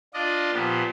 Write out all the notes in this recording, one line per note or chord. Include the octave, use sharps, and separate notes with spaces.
D4 F4 D5 D#5
A#2 F3 B3 G4